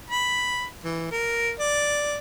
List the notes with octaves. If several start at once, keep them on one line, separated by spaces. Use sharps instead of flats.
B5
E3
A#4
D5